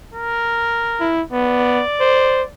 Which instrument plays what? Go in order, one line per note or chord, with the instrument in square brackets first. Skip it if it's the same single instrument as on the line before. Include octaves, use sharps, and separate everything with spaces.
[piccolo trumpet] A#4
[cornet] E4
[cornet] B3 [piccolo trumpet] D5
[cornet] C5